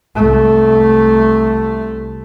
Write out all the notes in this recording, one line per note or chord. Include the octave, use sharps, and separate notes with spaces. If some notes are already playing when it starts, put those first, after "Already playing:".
C2 A3